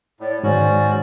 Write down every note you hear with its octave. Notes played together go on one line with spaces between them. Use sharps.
A2 C#5 D5
G#2 D#3 F#3 C#4 D#4 F#4 C5 D5